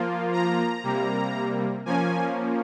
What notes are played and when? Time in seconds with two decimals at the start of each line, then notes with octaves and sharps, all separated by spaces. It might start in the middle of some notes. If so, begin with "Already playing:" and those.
Already playing: F3 A#3 F4
0.33 A#5
0.83 C3 G3 A#3
1.86 F3 A#3 C#4 G#5